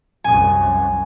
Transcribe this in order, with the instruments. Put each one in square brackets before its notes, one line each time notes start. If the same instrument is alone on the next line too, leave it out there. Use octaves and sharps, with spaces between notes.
[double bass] C2 F#2 [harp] G#5